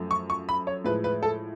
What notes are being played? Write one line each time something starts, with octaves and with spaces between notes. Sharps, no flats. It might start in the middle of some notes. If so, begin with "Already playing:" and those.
Already playing: F#2 F3 A3
C#6
C#6
B5
C#5
A2 F3 G#3 B4
B4
A4